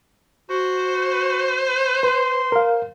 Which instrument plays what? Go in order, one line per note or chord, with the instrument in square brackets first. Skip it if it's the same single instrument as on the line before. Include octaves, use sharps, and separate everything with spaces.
[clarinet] F#4 [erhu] C5
[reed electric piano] B4 [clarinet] C6
[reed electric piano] A#4 F5